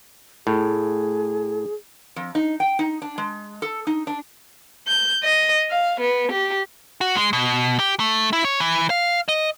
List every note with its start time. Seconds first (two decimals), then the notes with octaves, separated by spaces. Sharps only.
0.47 A2 G#4
2.16 F2
2.35 D#4
2.60 G5
2.79 D#4
3.02 D4
3.18 G#3
3.62 A4
3.87 D#4
4.07 D4
4.88 G6
5.24 D#5
5.70 F5
6.00 B3
6.32 G4
7.01 F#4
7.17 G#3
7.33 B2
7.79 G4
8.00 A3
8.33 E4
8.45 C#5
8.60 E3
8.90 F5
9.29 D#5